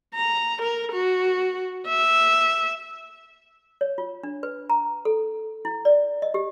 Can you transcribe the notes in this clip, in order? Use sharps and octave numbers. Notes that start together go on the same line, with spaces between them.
A#5
A#4
F#4
E5
C#5
F4
D4
B4
A#5
A4
E4
D5
D#5
G4